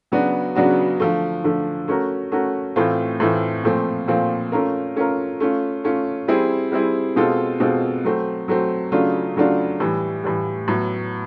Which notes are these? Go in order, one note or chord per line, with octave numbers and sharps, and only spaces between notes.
C#3 F#3 B3 D4 F#4
C#3 F#3 B3 D4 F#4
D3 F3 A3
D3 F3 A3
A3 C#4 F#4 A#4
A3 C#4 F#4 A#4
A2 E3 A3 C4 F4
A2 E3 A3 C4 F4
A#2 F3 A3 C4
A#2 F3 A3 C4
A3 C#4 F4 A#4
A3 C#4 F4 A#4
A3 C#4 F4
A3 C#4 F4
G3 C4 E4 G#4
G3 C4 E4 G#4
B2 G#3 C4 F4 A4
B2 G#3 C4 F4 A4
F#3 A3 C4
F#3 A3 C4
C#3 F#3 A3 D4 F4
C#3 F#3 A3 D4 F4
A2 E3 G3
A2 E3 G3
A2 F#3 B3